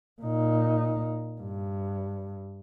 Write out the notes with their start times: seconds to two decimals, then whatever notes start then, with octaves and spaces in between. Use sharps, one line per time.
0.22 A#2 D#4
1.41 G2